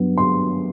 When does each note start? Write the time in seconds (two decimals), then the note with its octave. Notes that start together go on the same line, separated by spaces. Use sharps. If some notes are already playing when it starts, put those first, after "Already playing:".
Already playing: G2 F#3 B3
0.18 C6